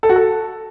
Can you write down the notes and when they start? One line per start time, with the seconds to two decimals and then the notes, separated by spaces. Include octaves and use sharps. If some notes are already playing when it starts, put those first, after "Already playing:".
0.03 A4
0.09 F#4
0.16 A4